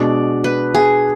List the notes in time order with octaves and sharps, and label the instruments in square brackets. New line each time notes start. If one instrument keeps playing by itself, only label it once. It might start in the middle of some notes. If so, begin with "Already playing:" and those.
Already playing: [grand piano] B2 G#3 D4 [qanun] D5
[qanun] B4
G#4